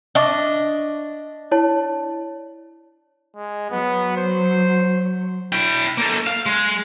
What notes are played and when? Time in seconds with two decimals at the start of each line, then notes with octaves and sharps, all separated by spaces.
0.15 D4 D#5 E5 C#6 D6
1.52 E4 C#5 A5
3.36 G#3
3.71 F#3 B3
4.17 C5
5.52 E4 G5
5.98 A#3 A4
6.27 F5
6.46 G#3